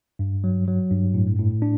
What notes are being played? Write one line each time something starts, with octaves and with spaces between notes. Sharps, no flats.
G2
F#3
F#3
G2
A2
A2
D4